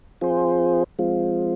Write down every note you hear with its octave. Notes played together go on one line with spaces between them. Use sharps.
F3 C4 F4 G#4 C5
F3 G#3 C4 F4